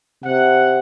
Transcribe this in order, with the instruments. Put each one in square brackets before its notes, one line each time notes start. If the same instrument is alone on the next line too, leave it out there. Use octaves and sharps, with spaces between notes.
[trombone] C3 [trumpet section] F#5